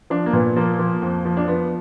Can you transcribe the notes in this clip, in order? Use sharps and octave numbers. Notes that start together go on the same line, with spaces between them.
F3 D4
A#3
A#2 B3
F3 A#3
F3
F2
F3
D4
F3 B3